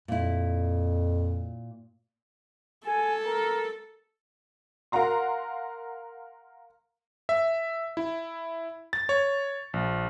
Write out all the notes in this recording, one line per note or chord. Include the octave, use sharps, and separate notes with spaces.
F2 A#2 E4
A4 G#5
A#4
A#4 F5 F#5 A#5 C6
E5
E4
A6
C#5
A#1